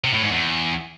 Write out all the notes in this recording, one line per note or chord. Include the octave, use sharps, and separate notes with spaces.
C3
A2
G#2
E2